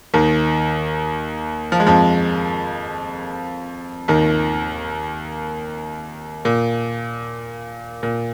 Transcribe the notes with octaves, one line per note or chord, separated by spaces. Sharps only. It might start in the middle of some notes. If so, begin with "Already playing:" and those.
D#2 D#3
F3
G#3
F2 F3
D#2 D#3
A#2
A#2